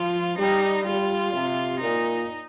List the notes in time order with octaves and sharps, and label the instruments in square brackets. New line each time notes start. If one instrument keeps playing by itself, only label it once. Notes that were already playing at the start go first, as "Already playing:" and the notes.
Already playing: [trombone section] F3 [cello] F4
[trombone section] G3 [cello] D#4
[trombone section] G3 [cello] F4
[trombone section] C3
[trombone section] A#2 [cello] D#4